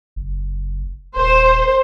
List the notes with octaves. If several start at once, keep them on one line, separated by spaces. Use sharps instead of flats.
F#1
D#1 C5